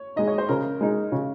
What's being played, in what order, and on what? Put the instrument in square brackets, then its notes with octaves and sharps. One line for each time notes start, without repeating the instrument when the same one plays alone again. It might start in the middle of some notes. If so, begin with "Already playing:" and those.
Already playing: [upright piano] C#5
[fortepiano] G#3 D#4 [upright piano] D#5
[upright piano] C#5
C5
[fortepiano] C#3 [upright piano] A#4
[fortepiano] G#3 D#4
C#3